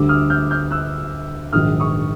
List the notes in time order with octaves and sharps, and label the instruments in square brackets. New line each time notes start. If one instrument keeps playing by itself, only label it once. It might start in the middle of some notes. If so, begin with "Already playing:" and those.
Already playing: [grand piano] D2 D3 G3 D6 E6
D#6 F6
F6 G6
F6 G6
E6 F#6
A#1 G#2 D#3 F#3 D#6 F6
C#6 D#6